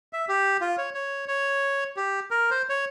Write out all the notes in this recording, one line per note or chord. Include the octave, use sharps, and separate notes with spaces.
E5
G4
F4
C#5
C#5
C#5
G4
A#4
C5
C#5